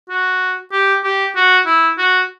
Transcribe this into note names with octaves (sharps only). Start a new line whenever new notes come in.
F#4
G4
G4
F#4
E4
F#4